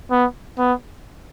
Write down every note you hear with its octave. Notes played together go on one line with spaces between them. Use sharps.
B3
B3